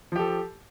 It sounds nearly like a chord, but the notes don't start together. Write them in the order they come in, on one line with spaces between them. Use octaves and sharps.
F3 G4 A4